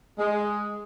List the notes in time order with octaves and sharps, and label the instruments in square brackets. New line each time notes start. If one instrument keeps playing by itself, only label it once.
[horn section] G#3